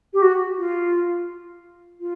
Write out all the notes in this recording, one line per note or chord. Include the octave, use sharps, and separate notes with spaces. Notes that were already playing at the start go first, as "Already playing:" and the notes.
G4
F#4
F4
F4